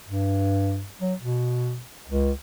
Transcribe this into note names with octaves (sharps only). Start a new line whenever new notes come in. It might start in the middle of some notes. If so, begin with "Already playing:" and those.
G2
F#3
B2
C#2